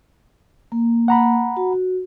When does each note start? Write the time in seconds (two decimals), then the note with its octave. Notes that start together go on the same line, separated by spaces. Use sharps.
0.72 A#3
1.08 F#5 A#5 B5
1.57 F#4